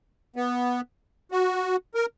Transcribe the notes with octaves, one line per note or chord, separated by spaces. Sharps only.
B3
F#4
A#4